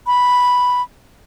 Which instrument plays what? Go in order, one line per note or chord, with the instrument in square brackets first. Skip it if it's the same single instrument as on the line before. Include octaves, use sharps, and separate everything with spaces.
[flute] B5